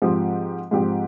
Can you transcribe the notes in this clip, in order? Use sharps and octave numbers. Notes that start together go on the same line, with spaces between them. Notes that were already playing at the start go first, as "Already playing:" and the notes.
G#2 F3 C4 G4
G#2 F3 C4 G4